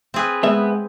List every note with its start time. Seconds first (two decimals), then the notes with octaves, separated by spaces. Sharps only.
0.14 C4 G#4 B4
0.43 G#3 B3 E5